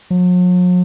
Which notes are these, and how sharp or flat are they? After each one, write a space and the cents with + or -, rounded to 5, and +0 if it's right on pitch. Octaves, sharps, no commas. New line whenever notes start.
F#3 -45